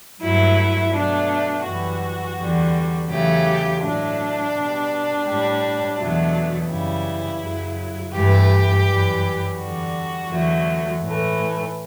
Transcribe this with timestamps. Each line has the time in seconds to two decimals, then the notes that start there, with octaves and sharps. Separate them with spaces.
0.21 G2 F#3 A3 E4
0.93 B2 F#3 A3 D4
1.64 F#2 E3 G3 F#4
2.36 E2 D3 G3
3.08 E2 C#3 F#3 A3 G4
3.80 A2 F#3 A3 D4
4.53 B2 G3
5.25 A2 G3
5.97 E2 B2 F#3 A3
6.68 F#2 C#3 E3 G3 E4
7.40 F#2 C#3 F#3
8.12 G2 E3 A3 G4
8.85 F#2 E3 G3
9.56 E2 D3 G3 F#4
10.28 E2 D3 F#3 A3
11.00 A2 E3 A3